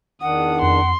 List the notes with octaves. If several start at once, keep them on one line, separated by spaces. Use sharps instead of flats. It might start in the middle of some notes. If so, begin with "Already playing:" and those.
E2 D#3 D4 F#5 D#6
F2 C6